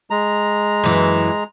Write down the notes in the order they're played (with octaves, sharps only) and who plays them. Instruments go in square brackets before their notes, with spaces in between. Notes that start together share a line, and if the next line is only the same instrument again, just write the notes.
[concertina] G#3 A#5
[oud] F#2 E3